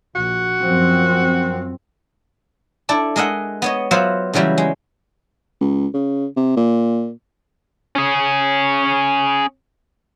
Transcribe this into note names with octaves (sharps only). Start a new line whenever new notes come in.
A#1 F#4
F#2 F3 C4
D4 E4 A4 D5
G#3 A#4 D#5 E5 F#5
B3 C#5 D#5
F#3 B3 F4 C5 E5 F#5
C#3 E3 F#3 G3 E4
G#3
C#2
C#3
C3
A#2
C#4 G#4